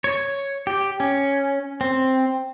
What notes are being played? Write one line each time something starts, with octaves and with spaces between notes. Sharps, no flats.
C#5
G4
C#4
C4